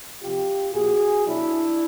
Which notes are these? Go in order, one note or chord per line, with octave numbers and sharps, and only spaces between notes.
C3 F3 F4 G4
A#2 F3 F#4 G#4
B2 F#3 D4 E4